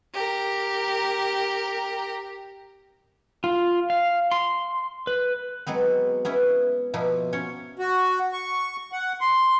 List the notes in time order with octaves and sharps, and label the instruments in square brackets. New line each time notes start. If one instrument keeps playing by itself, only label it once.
[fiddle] G4 A#4
[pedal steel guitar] F4
F5
C6
B4
[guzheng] F#3 G#3 B3 C4
B3 C#4 E4 B4
B2 F3 A#3 E4
C#4 C#5 F#5
[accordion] F#4
C#6
F#5
C6